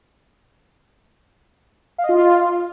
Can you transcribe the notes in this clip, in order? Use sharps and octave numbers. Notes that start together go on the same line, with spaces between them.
F5
D#5
F4